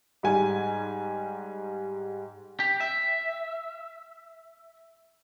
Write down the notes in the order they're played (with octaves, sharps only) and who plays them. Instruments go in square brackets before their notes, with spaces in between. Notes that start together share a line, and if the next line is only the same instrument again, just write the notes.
[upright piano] G#2 G3 G#5
[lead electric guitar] G4
E5